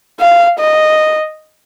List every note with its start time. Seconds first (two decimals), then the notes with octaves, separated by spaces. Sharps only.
0.20 F5
0.59 D#5